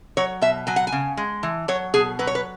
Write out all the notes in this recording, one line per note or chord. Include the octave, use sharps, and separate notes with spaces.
F#3 C#5
B2 E5
F#3 G#5
F#5
G#5
C#3
G#3
E3
F#3 C#5
B2 G#4
F#3 B4
C#5
B4